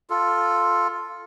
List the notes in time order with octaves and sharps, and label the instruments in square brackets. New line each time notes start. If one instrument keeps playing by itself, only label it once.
[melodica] F4 A4